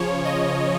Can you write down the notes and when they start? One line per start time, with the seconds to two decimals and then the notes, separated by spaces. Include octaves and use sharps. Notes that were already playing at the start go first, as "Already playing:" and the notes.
Already playing: C#3 F3 C#5
0.25 D#5